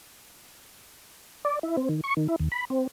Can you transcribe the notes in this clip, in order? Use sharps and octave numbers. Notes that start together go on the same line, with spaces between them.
D5
E4
C4
D#3
C#6
D#3
E4
D#2
B5
C4